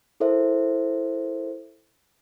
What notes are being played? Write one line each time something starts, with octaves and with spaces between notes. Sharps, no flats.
E4 A4 A#4 C5 E5